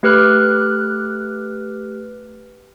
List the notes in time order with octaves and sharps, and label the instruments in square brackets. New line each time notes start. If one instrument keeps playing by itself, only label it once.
[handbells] A3 G4 B4 F6 F#6